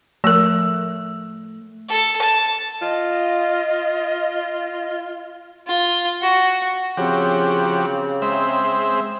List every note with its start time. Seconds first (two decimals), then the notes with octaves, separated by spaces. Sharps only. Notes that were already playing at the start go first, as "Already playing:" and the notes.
0.24 F3 A3 A#4 E6
1.89 A4
2.22 A5
2.82 F4 D#5
5.67 F4
6.22 F#4
6.97 C#3 F3 C4 F#4 G4
8.22 G#3 C5 E5